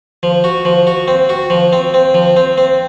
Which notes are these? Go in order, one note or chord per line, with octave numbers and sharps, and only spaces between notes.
F3
F#4
F3
F#4
C4
F#4
F3
C4
C4
F3
C4
C4